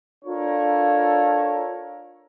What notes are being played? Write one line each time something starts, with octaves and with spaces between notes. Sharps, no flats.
D4 F4 A4 A#4 C#5